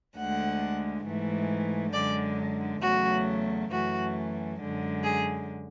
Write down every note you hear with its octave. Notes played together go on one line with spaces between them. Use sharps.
D2 D3 G#3 F#5
G#2 E3 A3
F#2 D3 G#3 D5
E2 C#3 F#3 A3 F#4
F#2 E3 A3 F#4
F#2 D3 G#3
G#4